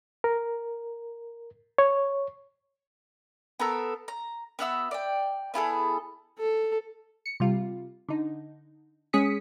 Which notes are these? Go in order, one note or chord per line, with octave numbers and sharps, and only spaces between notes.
A#4
C#5
B3 A4 A#4 E6
A#5
B3 F#4 E5 E6
D5 G5
B3 E4 G#4 A4
A4
C#7
C3 G3 F4
D3 D#4
G#3 C#4 G#4 D#6 B6 C#7